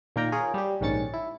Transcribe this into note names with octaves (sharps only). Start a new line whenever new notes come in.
A#2 D#3 A#3 A#4 G5 A#5
F4 G#4 A#4 C#5
G3 G4
A#1 G#2 D#3 C#4 A6 C#7
E4